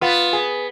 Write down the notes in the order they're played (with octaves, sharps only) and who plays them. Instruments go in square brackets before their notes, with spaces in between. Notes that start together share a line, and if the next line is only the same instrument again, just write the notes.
[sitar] B3 [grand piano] F4
[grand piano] G#4